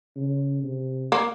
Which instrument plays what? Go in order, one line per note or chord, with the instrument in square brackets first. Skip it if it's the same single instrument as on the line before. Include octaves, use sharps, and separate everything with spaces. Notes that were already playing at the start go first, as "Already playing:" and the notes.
[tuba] C#3
C3
[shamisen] A#3